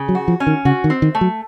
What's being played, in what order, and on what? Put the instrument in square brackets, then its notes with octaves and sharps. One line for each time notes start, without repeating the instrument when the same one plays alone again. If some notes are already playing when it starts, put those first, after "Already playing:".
Already playing: [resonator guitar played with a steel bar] C#3
[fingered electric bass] F#3
[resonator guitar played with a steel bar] F#4
[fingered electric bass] F3
[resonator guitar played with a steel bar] C#4
[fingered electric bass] D#3
[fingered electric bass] C#3 [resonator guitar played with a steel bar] F#4
[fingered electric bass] D#3
[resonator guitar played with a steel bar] C4
[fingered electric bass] D#3
[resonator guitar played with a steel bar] A3
[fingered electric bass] F#3